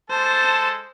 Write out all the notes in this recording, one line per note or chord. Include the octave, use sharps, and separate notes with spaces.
G#3 A4 C5 A5